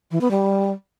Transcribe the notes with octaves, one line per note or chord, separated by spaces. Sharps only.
E3
B3
G3